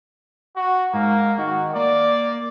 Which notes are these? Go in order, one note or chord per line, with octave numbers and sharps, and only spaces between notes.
F#4
G#2 A#3
D#3 F#4
A#3 D5